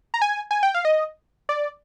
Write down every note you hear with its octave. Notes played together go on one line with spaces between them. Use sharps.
A#5
G#5
G#5
G5
F5
D#5
D5